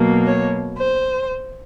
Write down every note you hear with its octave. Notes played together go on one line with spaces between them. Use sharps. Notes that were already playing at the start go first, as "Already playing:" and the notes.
Already playing: B2 F#3 A#3
C#5
C5